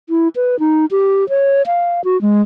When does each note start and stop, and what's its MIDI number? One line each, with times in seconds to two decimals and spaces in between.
0.10 0.28 64
0.36 0.59 71
0.59 0.86 63
0.91 1.28 67
1.29 1.62 73
1.66 2.04 77
2.04 2.20 66
2.22 2.42 56